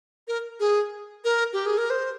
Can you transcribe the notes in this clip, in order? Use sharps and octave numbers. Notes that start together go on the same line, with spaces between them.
A#4
G#4
A#4
G4
G#4
A#4
C5